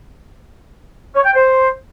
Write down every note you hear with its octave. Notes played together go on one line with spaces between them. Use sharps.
C#5
G5
C5